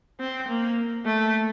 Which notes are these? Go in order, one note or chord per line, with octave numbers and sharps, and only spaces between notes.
C4
A#3
A3